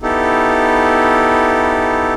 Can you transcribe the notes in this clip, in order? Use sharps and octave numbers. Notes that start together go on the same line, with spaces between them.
B3 D#4 E4 G4 A4